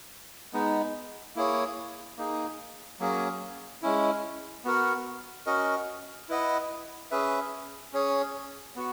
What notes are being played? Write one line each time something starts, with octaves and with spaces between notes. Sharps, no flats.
G#3 B3 D#4
A#3 E4 G#4 C#5
A#3 D#4 G#4
F#3 A#3 C#4 G#4
G#3 C#4 E4
B3 F#4 A#4
C#4 F#4 A#4 D#5
E4 B4 D#5 F#5
C#4 G#4 B4 E5
C#4 G#4 C#5
B3 F#4